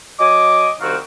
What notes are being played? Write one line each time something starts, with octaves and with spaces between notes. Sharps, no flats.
F#3 D#5 G#5 D6
C2 D#3 C4 F#4 F5